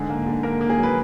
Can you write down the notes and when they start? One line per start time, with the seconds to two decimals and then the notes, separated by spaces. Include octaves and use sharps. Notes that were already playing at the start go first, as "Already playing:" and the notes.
Already playing: G#2 D3 G#4
0.09 A#3
0.26 D3
0.43 A#3 A#4
0.61 A#3
0.70 G#4
0.78 F#3
0.83 B4